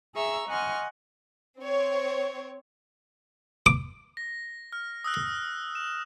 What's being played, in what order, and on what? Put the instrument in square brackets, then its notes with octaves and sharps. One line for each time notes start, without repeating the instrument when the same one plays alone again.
[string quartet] G#4 E5 A#5 C#6 E6
D#5 F#5 G#5 C6 C#6 F6
[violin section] C4 C#5
[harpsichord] D6
[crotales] A#6
F6
D#6 E6 F#6
E7